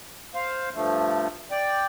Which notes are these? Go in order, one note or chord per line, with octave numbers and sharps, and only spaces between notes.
C5 F5
G2 F3 A3
D5 G5